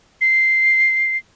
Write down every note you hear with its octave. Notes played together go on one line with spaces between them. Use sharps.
C7